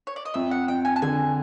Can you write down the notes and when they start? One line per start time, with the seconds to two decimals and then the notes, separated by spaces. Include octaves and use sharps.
0.07 C#5
0.16 D5
0.25 D#5
0.34 F2 E5
0.51 F#5
0.68 F2 G5
0.85 G#5
0.96 A5
1.02 D3 G#5